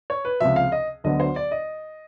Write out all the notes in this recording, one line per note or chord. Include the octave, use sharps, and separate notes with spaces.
C#5
B4
C#2 C3 F3 E5
F5
D#5
D2 D3 F#3 B3 D#5
C5
D5
D#5